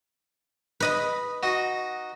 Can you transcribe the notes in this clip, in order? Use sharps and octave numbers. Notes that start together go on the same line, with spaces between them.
B4 D#5 B5
D#4 F#4